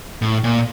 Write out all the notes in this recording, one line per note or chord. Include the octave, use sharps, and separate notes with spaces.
A2
A#2